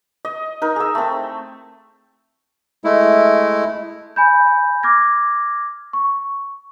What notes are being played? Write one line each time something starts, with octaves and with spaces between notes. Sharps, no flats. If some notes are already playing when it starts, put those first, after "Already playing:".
D#5
D#4 A#4
G#4 E6
A3 C4
G#3 A3 E4
G#5 B5 G6
D6 F6 G#6 A#6
C#6